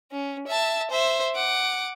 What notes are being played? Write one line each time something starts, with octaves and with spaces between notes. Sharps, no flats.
C#4
E5 A5
C5 E5
F#5 D6